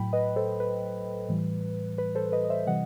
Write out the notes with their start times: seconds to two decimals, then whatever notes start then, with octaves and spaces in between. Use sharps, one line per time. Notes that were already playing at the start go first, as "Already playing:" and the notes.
Already playing: A2 F#3 G5 B5
0.13 B4 D#5
0.36 A4 C5
0.60 B4
1.29 A2 E3 G3
1.98 B4
2.15 A4 C5
2.32 B4 D#5
2.44 D#5
2.50 C5 E5
2.67 C3 E3 G3 D#5 F#5